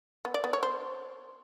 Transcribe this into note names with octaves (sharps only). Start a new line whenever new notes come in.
B3
D5
B3
C#5
C5